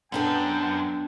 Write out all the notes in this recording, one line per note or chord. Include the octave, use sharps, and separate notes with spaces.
F#2 B3 D4 A4 G5